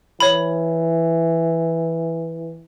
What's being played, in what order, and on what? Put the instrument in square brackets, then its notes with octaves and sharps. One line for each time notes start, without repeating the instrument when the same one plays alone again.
[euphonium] E3 [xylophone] C#5 B5